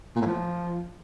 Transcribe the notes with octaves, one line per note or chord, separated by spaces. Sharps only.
A#2
A2
F3